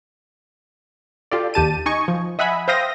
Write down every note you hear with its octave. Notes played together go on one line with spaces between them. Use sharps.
F4 G4 A4 D5
D#2 G4 A5 D#7
D#4 D#5 G#5 C#6
F3
D#5 E5 F#5 G#5 B5
C5 E5 F5 G5 D#6 A#6